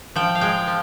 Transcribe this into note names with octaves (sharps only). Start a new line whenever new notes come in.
F3 G5
F5
G#3 G5
F3